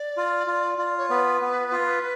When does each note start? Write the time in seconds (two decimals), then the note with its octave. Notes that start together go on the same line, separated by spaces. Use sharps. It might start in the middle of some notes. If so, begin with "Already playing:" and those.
Already playing: D5
0.17 F4
0.47 F4
0.78 F4
0.98 C#5
1.10 B3 B4
1.41 B3
1.72 F4